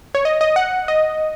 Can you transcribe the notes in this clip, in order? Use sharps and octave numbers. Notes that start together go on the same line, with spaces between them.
C#5
D#5
D#5
F#5
D#5